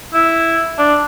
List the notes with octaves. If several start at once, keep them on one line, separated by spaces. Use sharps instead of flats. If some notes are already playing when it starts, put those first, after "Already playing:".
E4
D4